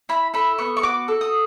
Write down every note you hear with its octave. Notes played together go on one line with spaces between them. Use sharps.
E4 B5
A4 B5
B3 C#6
C#6
F#4 D6
A4
D#6